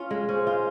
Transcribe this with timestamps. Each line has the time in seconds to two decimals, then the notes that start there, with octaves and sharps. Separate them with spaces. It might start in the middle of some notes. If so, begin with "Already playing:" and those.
Already playing: C#4 F4
0.11 G#3
0.28 C#4 G#4 C5
0.47 F4